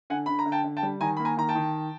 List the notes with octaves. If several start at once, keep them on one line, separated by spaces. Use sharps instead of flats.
D3 F#5 G#5
D3 B5
A#5
D3
G5 A5
D3
G5 A5
G3
D#3 G#5 A#5
A#3 B5
G#5 A#5
D#3 A#5
G5 A5
D#3